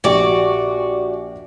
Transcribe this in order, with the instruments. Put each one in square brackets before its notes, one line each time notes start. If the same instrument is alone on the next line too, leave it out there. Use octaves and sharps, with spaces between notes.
[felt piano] A#1 G4 C#6 [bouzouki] F#4 D5